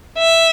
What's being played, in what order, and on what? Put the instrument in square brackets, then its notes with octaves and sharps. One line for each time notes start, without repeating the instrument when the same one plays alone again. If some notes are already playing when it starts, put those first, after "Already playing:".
[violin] E5